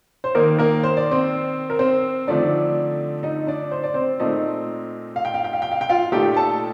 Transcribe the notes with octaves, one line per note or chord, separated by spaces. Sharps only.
C5
D#3 A#3 D#4 A#4
A#3 A#4
C5
D5
C4 C5
A#4
C4 C5
D3 F3 A3 C4 D4 D#4 D5
D#4 D#5
D4 D5
C5
D5
C4 C5
A#2 A3 C4 D#4 D#5
F5
G5
F5
G5
F5
G5
F5
G5
F4 F5
A#2 A3 D#4 G4 G5
A4 A5